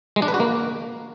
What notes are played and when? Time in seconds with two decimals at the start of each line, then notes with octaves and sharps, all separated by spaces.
0.16 G#3
0.22 D4
0.28 B4
0.34 F#4
0.40 A#3